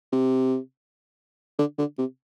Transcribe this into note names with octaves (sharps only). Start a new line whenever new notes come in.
C3
D3
D3
C3